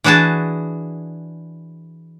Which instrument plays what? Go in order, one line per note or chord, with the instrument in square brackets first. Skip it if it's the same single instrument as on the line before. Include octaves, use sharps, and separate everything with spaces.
[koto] E3 D4 F#4 G#4 A5